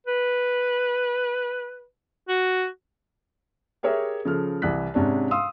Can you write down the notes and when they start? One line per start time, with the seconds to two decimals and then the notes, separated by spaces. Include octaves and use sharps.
0.07 B4
2.28 F#4
3.83 G4 G#4 A#4 C#5 E5
4.25 C#3 F3 A4 F6
4.62 C2 E3 F#6 B6
4.94 G#2 C3 C#4 D4
5.31 F5 C6 D#6 E6